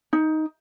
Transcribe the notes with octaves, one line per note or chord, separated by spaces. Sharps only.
D#4